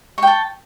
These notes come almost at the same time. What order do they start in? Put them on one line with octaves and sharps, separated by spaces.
C#6 G5 A5